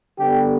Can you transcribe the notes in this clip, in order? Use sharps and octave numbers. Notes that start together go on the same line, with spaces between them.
D3 G3 B3 G4